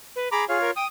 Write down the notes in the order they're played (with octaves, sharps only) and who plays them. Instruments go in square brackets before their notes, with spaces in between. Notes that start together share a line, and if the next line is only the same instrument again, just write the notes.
[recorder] B4
[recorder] G#4 [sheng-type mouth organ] A#5 B5 D6
[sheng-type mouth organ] F4 C#5 F5 [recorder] G#4
[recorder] A#4
[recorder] G5 [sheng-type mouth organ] D#6